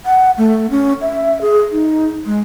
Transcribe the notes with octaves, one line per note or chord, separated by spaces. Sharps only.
F#5
A3
C#4
E5
G#4
D#4
G#3